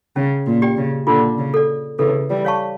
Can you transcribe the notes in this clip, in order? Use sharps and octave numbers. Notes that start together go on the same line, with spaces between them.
C#3 C#4
A#2
G4 D5 G5
C#3
A#2 D3 F4
C#3
A4 D5
C#3 E3 A4
E3 G3
C#5 F5 A5 C#6